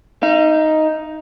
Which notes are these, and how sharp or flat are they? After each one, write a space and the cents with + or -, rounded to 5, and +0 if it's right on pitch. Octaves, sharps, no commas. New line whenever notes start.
D#4 +5 F5 -45